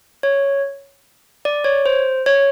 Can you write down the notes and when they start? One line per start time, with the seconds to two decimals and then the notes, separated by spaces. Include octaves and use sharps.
0.23 C#5
1.45 D5
1.64 C#5
1.86 C5
2.26 C#5